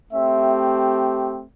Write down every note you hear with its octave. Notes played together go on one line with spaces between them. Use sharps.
A3 C4 G4 E5